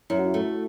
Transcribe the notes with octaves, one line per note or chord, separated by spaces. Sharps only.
F#2 E4
F#4
E4
A3